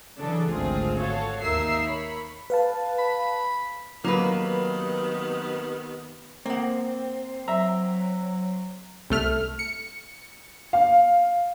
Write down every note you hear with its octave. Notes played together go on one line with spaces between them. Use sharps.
C#3 E3 F#3 D4 A4
G#1 D2 C4 F4 G#4
F#4 A4 C#5 F5
D#2 D#4 A#4 E5 E6 C7
A#4 C#5 B5
B4 F5 A5
B5
C3 D#3 F#3 A#3 B3 B4
A#3 C4 F#5
F#3 E5 A#5
C2 A3 F6
C#7
F5